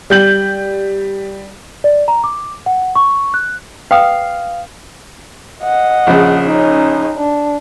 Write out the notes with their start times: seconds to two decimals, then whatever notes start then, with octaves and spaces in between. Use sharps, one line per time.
0.10 G3 G6 F#7
1.84 D5
2.08 A#5
2.24 D6
2.66 F#5
2.95 C#6
3.34 F#6
3.91 B4 F5 G5 D#6
5.62 D#5 F#5
6.07 A#1 C#3
6.45 C#4 D#4
7.17 D4